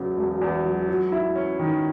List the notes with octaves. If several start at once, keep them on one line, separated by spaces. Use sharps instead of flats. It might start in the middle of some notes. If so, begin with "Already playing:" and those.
Already playing: E2 C#3 F#3
E1
E2
F#3
F#3
E4
C#4
D#3